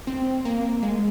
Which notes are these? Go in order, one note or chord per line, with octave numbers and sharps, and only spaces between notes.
C4
A#3
G#3